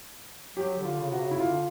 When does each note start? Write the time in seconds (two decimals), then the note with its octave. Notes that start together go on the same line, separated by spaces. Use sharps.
0.57 F#3 G4
0.78 D3
0.85 F4
0.98 C#3
1.11 C3 F#4
1.20 C#3
1.31 E4
1.39 D3 F4